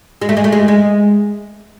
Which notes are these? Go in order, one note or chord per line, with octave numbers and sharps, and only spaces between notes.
G#3
A3
G#3
A3
G#3
G#3